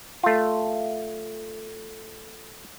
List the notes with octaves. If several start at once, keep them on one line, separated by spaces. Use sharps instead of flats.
A3 F4